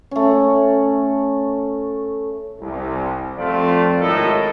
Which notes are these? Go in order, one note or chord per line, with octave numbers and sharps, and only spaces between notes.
A3 C#4
C2
F2 A3 C4 F4 D5 F5
G#1 A2 E4 A4 A#4 D#5